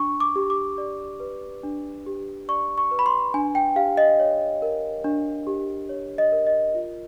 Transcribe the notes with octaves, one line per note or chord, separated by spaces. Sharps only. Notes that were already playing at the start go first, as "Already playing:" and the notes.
Already playing: D4 C#6
D6
G4
D6
D5
B4
D4
G4
D5 C#6
C#6
B4
B5
C6
D4 G#5
G5
G4 F5
D#5
C#5
A#4
D4
G4
C#5
D#5
A#4
D#5
F4